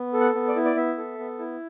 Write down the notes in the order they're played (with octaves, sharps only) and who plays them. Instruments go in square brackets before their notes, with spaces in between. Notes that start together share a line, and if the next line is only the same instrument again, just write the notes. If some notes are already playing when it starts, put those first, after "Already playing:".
Already playing: [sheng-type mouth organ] B3
A4
F#5
B3
D5
E4
D5
B3 E5
A4
B3
E4